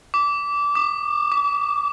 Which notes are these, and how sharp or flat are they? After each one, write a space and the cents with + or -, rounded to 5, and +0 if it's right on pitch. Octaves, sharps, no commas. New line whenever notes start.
D6 -20
D6 +40
D6 -40